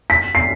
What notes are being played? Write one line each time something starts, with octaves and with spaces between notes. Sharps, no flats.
B6
C7